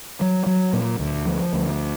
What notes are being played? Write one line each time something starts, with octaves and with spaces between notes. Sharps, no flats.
F#3
F#3
A#2
D2
F3
D2